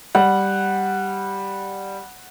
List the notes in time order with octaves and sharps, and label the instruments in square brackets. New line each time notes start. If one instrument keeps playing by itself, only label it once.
[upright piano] G3 [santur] F#5